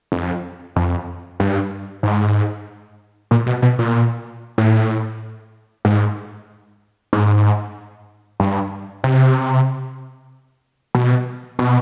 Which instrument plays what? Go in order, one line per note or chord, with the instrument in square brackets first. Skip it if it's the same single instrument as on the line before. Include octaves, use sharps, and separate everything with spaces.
[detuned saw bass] F2
F2
G2
G#2
A#2
B2
B2
A#2
A2
G#2
G#2
G2
C3
B2
B2